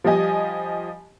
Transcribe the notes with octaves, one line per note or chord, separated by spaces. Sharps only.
F3 G3 G4 D#5 G#5